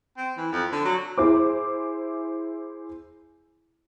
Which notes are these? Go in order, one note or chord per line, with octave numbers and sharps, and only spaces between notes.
C4
E3
F2
D3
F#3
E4 G#4 C5 D6